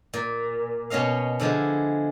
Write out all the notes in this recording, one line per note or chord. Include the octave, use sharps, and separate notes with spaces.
A#2
B2 B3 C#4 D#5 F5
D3 F3 G#3 E4